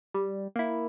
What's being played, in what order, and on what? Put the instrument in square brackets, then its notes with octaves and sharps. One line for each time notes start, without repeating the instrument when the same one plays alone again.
[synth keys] G3
A#3 E4